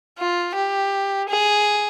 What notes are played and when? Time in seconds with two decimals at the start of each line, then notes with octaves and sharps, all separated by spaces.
0.18 F4
0.55 G4
1.29 G#4